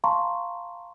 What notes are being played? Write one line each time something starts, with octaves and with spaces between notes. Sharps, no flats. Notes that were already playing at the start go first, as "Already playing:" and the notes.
F5 A5 A#5 C6 C#6